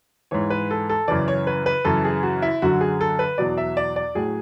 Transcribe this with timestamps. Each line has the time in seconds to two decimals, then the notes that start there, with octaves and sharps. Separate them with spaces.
0.31 G#2 E3 C#5
0.50 B4
0.71 A4
0.89 A4
1.08 F#2 C#3 E3 D5
1.28 C#5
1.47 B4
1.66 B4
1.85 F#2 C#3 E3 A4
2.05 G#4
2.23 F#4
2.42 E4
2.62 F#2 D3 F#3 F#4
2.81 G#4
3.01 A4
3.19 B4
3.38 E2 B2 F#3 D5
3.58 E5
3.77 D5
3.96 D5
4.15 A2 F#3 G#4